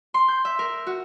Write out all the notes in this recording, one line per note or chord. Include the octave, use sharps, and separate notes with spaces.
C6
G6
E5
A#4
F#4